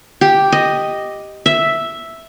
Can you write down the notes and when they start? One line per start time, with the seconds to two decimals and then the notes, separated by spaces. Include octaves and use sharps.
0.21 G4
0.52 D#5
1.46 E5